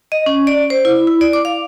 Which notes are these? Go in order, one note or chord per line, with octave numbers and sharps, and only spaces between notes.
D#5
C#4
D5
C5
E4
E4
D5
D6
F5